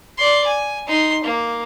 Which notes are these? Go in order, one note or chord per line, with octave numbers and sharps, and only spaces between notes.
D5 C6
G#5
D#4 C6
A#3